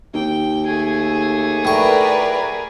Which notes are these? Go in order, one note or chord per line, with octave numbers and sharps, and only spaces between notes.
D#2 G5
A3 G#4
A2 A#4 B4 D5 C#6